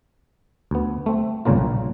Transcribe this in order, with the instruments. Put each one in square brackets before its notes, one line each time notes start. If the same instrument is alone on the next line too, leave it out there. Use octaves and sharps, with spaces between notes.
[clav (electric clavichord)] D2 B3
A3 C4
G1 C#2 A#2 C#3 A#3 F4
A#1